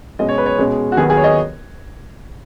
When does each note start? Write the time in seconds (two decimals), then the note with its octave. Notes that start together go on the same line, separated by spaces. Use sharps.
0.19 B2 G#3 C#4 D#5
0.29 C#5
0.38 B4
0.46 C#5
0.58 B2 G#3 C#4
0.92 F#4
0.97 D#2 D#3 F#3 B3 G#4
1.10 G#4
1.17 C#5
1.24 D#5